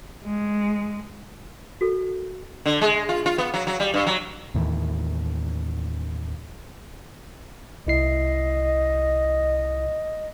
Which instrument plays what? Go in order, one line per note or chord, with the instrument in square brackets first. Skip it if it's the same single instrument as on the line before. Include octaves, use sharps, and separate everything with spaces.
[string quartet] G#3
[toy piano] F#4 A4 A#4
[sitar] D3
G#3
F4
F4
B3
F#3
F#3
G3
G2
F#3
[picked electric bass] D#2 A2 D#3 E3
[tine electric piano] C2 E4 C7 [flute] D#5